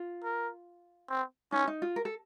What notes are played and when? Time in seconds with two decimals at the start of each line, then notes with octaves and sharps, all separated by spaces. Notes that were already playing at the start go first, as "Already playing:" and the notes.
Already playing: F4
0.24 A#4
1.10 C4
1.52 C#4 D#4
1.67 D#4
1.82 F4
1.96 A#4
2.05 A4